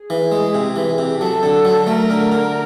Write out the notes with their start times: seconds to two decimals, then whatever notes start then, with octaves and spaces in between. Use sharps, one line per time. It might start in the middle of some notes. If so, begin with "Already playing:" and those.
Already playing: G#4
0.10 E3
0.32 G#3
0.55 C3
0.76 E3
0.98 C3
1.20 F#3 A4
1.43 D3
1.65 F#3
1.87 A3 A#4
2.10 D3
2.32 D3